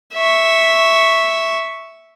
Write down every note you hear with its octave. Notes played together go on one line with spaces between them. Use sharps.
E5 C#6